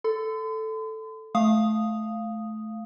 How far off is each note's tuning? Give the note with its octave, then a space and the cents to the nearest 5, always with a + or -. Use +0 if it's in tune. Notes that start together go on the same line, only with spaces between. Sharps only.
A4 +0 C6 -45
A3 -20 F5 +0 D#6 +0